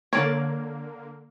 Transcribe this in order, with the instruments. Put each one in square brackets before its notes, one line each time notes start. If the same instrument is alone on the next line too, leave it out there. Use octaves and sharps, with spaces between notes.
[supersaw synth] D3 A#3 [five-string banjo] C#5 D5